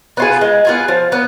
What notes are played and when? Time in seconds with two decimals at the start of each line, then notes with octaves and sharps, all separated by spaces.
0.17 B3 F4 G#4
0.41 G#3
0.65 B3 F4 G#4
0.88 F3
1.12 B3